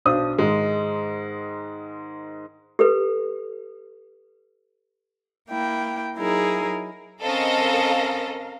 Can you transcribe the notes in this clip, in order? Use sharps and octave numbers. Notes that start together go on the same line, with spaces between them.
B1 D4 C5 D#6
G#2 D#3 G#3
G4 A4 B4
A#3 E4 G5
F#3 D#4 E4 G#4 A#4
C4 C#4 A4 A#4 D#5 F5